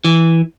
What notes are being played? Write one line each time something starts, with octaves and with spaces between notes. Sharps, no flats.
E3